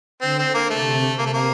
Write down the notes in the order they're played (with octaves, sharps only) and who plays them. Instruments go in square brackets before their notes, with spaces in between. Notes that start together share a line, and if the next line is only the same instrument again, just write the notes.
[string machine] D3 [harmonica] C4
[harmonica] C4
A#3
[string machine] C3 [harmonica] A3
[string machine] C3 [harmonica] A#3
[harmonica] A3
A#3